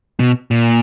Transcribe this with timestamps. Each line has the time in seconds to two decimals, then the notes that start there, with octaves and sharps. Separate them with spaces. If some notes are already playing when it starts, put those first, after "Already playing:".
0.20 B2
0.51 A#2